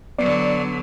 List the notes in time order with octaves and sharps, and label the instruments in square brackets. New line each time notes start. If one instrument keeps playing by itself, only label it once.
[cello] D3 F#3 [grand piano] B3 [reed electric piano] D5